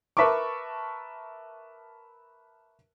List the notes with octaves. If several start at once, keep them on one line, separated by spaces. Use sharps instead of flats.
A#4 B4 E5 A5 C#6 D6